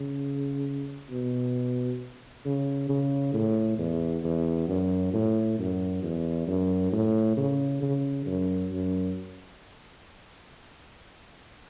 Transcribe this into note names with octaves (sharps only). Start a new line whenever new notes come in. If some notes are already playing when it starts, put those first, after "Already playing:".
Already playing: C#3
B2
C#3
C#3
A2
E2
E2
F#2
A2
F#2
E2
F#2
A2
C#3
C#3
F#2
F#2